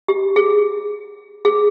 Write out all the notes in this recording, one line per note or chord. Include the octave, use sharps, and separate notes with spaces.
G4
G#4
G#4